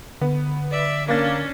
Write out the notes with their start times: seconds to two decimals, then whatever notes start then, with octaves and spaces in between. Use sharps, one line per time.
0.21 D3 B3
0.71 D5 E5
1.08 A#3 C#4 D4 A6